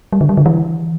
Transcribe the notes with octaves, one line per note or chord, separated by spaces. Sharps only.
G3
D3
G3
D3
E3